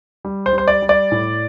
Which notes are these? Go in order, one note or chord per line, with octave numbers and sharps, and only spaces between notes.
G3
C5
G3
C5
D5
G3
D5
A2